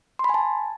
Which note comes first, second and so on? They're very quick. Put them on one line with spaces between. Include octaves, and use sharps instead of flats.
C6 B5 G#5 A5